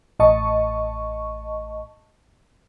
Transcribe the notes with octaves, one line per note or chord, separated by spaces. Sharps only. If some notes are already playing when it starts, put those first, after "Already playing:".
A1 D#5 A5 C#6